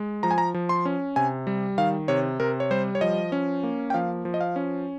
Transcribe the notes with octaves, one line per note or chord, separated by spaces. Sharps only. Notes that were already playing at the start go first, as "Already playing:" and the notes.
Already playing: G#3
F3 A#5
G#5
A#5
F3
C6
C#4
C3 G#5
G3
D#3 F5
C3 C#5
C3 A#4
C#5
G3 C5
C#5
F3 D#5
C#4
A#3
G5
F3 F5
F3
D#5
F5
C#4